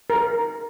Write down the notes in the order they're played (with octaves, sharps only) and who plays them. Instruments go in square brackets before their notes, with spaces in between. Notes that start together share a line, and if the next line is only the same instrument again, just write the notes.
[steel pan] A#4